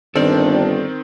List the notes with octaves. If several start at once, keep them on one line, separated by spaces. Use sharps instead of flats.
G1 G2 D#3 C4 D4 A4 A#4 D5